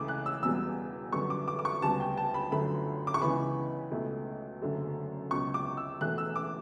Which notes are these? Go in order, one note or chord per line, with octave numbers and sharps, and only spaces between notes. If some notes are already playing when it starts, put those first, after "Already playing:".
Already playing: C#2 C#3 E3 A3 D6
F#6
E6
E1 E2 B2 G3 E6
F#2 D3 G3 B3 C#6
D6
D6
D6
C#6
D2 C#3 G3 B3 A5
G5
A5
B5
G1 F#2 D3 A3 B5
D6
C#6
C#2 C#3 E3 B3 B5
C#2 B2 A3
F#1 F#2 D3 A3
C#2 B2 F#3 C#6
D6
E6
E1 E2 B2 A3 F#6
E6
D6